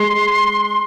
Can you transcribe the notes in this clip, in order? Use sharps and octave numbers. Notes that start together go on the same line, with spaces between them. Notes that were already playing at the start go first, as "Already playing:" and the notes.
Already playing: G#3 C6